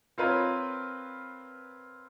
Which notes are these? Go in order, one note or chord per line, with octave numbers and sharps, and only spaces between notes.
C4 F4 A#4 B4 C#5